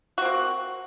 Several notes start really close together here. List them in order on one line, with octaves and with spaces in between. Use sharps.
F#4 C4 A#3